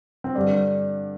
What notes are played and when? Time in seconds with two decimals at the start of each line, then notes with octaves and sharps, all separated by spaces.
0.24 C4
0.35 G2 D3 D4